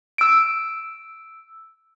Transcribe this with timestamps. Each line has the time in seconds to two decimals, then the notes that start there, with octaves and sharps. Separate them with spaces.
0.18 E6 D7